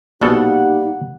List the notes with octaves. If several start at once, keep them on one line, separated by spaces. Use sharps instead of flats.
A#1 B2 G3 A#3 D#4 G4 A4 F#5